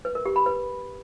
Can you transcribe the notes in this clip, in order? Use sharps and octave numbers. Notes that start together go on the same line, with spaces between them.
B4
A#4
G4
B5
B4